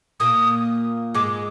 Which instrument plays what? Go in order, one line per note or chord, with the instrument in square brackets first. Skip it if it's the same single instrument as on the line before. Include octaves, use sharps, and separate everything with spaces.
[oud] A#2 A#3 [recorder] D#6
[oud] G#2 G#3 [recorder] D6